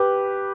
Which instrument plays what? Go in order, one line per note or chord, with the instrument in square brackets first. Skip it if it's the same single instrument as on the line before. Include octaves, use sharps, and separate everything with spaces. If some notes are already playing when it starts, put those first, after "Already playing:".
Already playing: [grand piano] G4 B4